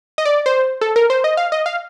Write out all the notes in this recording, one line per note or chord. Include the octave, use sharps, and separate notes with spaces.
D#5
D5
C5
A4
A#4
C5
D#5
F5
D#5
F5